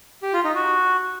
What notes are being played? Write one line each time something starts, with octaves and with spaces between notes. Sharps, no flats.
G4
F4
D#4
F#4